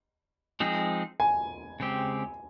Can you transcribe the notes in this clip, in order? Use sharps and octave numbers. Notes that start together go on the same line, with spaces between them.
F3 G#3 C4 D#4 G#4
G#5
C#3 G#3 C4 G4